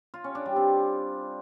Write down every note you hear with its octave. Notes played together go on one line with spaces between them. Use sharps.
F4
C#4
D4
G3
C4